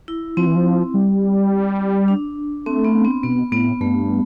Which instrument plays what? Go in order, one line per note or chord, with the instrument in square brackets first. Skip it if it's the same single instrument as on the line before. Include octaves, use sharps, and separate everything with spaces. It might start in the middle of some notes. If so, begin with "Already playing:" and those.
[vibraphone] E4
[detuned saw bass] F3 [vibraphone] C4
[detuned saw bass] E3
F3
G3
[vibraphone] D4
[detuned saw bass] A3 [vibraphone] C4
[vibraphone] B3
C4
[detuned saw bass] B2 [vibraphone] B3
[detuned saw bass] A2 [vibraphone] B3
[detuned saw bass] G2 [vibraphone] A3